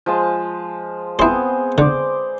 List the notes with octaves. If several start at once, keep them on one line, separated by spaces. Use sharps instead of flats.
F3 G#3 A5
B3 C4 E4 G#4 C5
D3 C5 D5